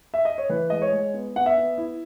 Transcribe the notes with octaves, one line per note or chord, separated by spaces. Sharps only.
E5
D#5
C#5
E3 B4
G#3 D#5
C#5
G#3
B3
B3 F#5
E5
B3
E4